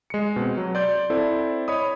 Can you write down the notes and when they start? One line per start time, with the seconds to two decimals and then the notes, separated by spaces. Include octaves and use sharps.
0.10 G#3 C#7
0.36 B2 C4
0.57 F#3
0.75 D5 C6 G6
1.10 C4 E4 A4 C5 D5
1.68 C#5 D#5 B5 D#6